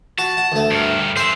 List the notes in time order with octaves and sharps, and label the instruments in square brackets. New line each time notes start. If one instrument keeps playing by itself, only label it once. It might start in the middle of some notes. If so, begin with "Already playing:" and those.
[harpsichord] F#4 [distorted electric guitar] A5
[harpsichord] F#5
D2 A3
[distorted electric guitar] G2 A#4
[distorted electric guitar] G#4 E5 [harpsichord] C5